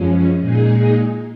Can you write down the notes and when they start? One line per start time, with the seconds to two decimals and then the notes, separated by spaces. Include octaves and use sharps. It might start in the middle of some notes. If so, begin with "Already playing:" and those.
Already playing: F#2 F3 G#3 C#4
0.40 A#2 G#3 D#4 G#4